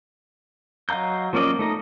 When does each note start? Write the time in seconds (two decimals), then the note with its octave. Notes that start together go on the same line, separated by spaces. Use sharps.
0.89 F#3 D#5 F5 A#5 G6
1.33 F3 A#3 C#4 D5 D#5
1.59 A3 D#4 A#5